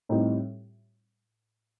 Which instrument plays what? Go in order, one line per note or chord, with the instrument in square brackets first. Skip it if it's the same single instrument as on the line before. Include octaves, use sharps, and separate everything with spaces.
[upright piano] A2 G3 C4 D#4 G4